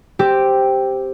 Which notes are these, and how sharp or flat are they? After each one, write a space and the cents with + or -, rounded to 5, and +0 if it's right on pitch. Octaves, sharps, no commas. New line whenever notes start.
C4 +0 G4 +0 E6 +0